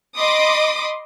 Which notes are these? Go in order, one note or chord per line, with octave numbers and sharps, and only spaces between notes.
D#5 B5 C6 D6 D#6